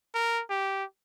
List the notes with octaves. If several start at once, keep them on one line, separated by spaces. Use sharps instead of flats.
A#4
G4